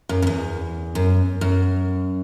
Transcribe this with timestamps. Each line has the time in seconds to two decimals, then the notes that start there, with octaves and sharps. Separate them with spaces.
0.09 F#2
0.22 F#2
0.27 E2
0.95 F#2
1.41 F#2